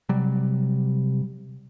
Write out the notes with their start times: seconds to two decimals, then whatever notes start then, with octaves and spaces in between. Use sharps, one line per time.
0.09 C3 F#3 G3